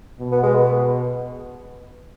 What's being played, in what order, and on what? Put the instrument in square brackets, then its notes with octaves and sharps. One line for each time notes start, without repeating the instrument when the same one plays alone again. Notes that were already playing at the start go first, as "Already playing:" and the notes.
[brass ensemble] B2
[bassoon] B3
G#3
B3